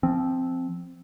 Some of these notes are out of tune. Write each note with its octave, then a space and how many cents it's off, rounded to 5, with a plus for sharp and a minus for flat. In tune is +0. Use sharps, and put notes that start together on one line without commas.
F3 -10 C4 +0